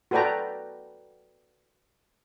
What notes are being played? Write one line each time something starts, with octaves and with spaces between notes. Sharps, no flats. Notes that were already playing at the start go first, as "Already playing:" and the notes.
F#4 A4 B4 D5 G5 A#5